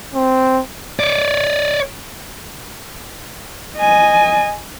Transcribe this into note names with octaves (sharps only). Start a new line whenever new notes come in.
C4
C#5 D5
D#5 G#5